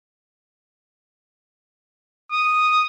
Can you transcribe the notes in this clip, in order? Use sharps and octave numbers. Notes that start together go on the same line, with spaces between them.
D#6